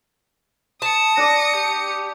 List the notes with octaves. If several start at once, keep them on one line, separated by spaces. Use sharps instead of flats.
A5 D#6 C#7
D4 D5 A#6
G4